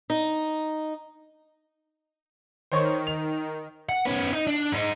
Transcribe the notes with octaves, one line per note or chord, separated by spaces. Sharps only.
D#4
D#3 C5 C#5 C#6
F7
F#5
B3 C#4
D#4
D4
G#2 D#4